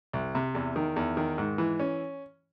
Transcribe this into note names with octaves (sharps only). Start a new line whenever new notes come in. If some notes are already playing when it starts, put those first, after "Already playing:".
C2
C3
E2
D#3
E2
D#3
G#2
E3
C#4